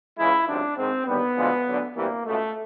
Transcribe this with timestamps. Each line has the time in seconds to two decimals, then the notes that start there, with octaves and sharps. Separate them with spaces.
0.17 C#2 C#3 E3 G#3 E4
0.48 C#2 C3 D#3 F#3 D4
0.77 G#2 D#3 G#3 C4
1.07 D#2 D3 G3 B3
1.36 D2 D3 F3 G#3
1.66 D2 D3 F#3
1.95 D2 C3 E3 G3 A#3
2.25 C#2 B2 G#3 A3